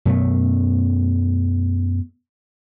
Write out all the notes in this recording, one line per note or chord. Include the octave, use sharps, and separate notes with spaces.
F#2 B2 A3